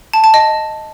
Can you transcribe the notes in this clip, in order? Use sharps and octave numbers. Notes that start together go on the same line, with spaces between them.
A5
A5
D#5